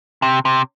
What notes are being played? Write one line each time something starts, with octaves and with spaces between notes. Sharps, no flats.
C3
C3